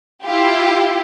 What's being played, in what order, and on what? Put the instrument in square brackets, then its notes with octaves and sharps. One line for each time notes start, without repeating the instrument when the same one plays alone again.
[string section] E4 F4 G4